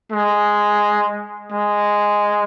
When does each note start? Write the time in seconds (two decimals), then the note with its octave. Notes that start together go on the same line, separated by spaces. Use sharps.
0.12 G#3
1.52 G#3